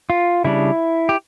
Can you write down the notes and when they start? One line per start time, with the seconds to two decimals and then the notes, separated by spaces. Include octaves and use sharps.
0.10 F4
0.44 C#3 G3 D4 E4
1.09 G4